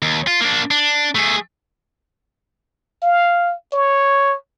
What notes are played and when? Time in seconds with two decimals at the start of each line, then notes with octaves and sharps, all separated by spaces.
0.02 D#2
0.27 F4
0.41 A#3 D4
0.71 D4
1.15 A3 G#4
3.02 F5
3.73 C#5